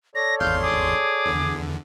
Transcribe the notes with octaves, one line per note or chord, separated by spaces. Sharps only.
A4 C#5 D5 A#6
G#1 E2 F5 C6 G6
G#4 D6
E2 D3